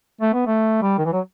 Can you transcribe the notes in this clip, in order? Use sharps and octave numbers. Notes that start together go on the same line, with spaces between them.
A3
B3
A3
G3
D#3
E3
F#3